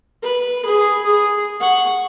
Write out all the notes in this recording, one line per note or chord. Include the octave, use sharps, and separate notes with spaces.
B4
G#4
G#4
F#5 C#6